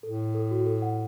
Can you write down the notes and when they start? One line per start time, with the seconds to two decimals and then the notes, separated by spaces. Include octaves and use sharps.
0.03 A2 A4
0.34 A4
0.51 F#4
0.66 A4
0.82 F#5